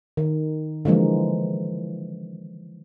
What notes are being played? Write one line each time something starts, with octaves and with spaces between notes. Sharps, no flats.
D#3
D3 E3 F3 G#3 A#3